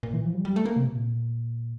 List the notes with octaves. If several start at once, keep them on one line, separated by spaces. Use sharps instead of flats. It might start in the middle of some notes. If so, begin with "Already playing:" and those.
A#2
E3
F3
G3
G3
A3
A#3
C3
A#2